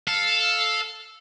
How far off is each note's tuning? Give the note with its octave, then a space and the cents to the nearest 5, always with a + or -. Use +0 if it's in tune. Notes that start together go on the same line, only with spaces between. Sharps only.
A4 +0 F5 +5